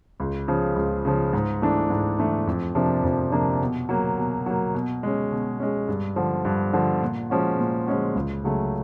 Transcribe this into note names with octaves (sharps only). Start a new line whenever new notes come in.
C#2
C#3 F3
C#2
C#3 F3
G#2
E3 A3 D4
G#2
E3 A3 D4
F2
C3 F3 A#3 D4
F2
C3 F3 A#3 D4
B2
F#3 A#3
B2
F#3 A#3
B2
G#3 C#4
B2
G#3 C#4
G2
D3 F3
G2
D3 F3
A#2
F3 G#3 C#4 F#4
A#2
F3 G#3 C#4 F#4
C#2
C#3 F#3 A3